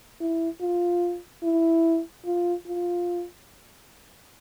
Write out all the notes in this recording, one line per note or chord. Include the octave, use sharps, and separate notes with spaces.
E4
F4
E4
F4
F4